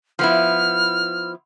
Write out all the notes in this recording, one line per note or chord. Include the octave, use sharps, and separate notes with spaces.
F3 B3 E4 F6